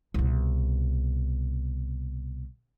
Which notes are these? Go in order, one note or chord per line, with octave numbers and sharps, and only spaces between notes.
C2 B2